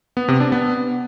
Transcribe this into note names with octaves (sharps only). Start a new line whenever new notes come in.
B3
C3
D4
B3